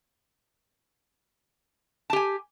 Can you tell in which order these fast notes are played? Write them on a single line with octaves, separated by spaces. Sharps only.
A5 G4 G#5